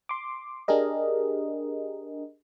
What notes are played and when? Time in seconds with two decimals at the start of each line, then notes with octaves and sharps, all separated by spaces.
0.09 C6 D6
0.68 D4 G4 G#4 A#4 D#5